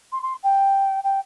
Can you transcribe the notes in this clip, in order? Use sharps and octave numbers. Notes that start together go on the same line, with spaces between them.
C6
C6
G5
G5